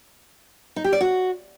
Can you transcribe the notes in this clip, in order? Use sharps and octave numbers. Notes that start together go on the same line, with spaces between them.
D#4
G4
D5
F#4